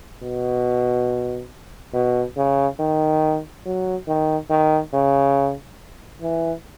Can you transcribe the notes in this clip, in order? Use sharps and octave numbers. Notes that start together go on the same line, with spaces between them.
B2
B2
C#3
D#3
F#3
D#3
D#3
C#3
E3